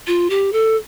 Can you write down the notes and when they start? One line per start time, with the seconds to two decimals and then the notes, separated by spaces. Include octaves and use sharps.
0.07 F4
0.30 G4
0.53 A4